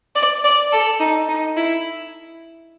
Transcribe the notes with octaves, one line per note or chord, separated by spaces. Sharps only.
D5
D5
A4
D#4
D#4
E4